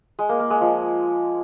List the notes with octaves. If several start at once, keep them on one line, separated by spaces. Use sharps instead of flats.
G#3
A#3
A#3
G#3
F3